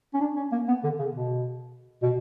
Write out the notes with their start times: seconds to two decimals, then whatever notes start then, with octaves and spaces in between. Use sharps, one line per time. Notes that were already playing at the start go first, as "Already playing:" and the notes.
0.14 C#4
0.21 D4
0.37 C#4
0.52 A#3
0.68 B3
0.84 D3
0.99 C#3
1.15 B2
2.02 B2